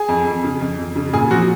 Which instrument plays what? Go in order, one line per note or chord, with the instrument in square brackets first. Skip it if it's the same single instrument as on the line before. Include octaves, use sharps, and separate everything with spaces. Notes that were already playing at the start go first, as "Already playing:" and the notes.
Already playing: [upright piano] G#4
F2
F2
C#3
F2
F2
C#3
A#2 G#4
F3 F#4